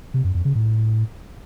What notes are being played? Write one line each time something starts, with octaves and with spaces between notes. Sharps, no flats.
C3
F#2
F2
C#3
A2